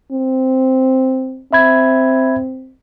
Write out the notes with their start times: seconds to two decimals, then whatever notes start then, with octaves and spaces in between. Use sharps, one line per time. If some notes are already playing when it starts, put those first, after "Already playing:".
0.12 C4
1.53 C4 E5 B5 G#6